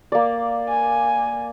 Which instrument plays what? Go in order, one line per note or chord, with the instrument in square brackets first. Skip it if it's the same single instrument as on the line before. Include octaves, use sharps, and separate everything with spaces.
[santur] A#3 D5
[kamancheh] G#5